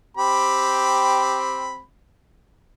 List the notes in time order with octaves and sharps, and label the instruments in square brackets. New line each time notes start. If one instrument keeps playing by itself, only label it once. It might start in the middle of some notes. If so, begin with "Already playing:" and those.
[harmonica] C4 G4 B5